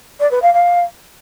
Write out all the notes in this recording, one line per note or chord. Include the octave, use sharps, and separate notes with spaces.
D5
B4
F5
F5